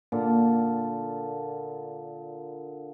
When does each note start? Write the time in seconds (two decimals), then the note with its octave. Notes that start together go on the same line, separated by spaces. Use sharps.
0.12 A#2 D3